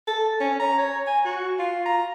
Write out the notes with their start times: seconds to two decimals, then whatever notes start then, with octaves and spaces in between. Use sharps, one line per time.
0.07 A4
0.40 C#4
0.59 A#5
0.78 C#5
1.07 G#5
1.25 F#4
1.59 F4
1.85 A#5